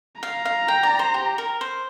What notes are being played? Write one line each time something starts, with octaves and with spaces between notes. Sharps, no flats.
F5 A#5
F5
G5
D5
C5
G4
A#4
C5